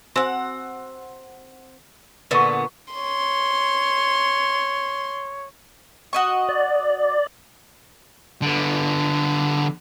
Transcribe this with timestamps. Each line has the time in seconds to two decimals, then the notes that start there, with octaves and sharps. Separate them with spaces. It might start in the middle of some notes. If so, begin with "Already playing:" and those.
0.16 C4 F#4 C5 F#5 G#5
2.31 A#2 D3 B3 B4 E5 C#6
2.93 C#5 C6
6.13 F#4 D#5 C#6
6.49 D5
8.42 D3 B3